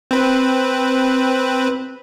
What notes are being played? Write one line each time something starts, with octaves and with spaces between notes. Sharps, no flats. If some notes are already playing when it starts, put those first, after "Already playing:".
C4 B4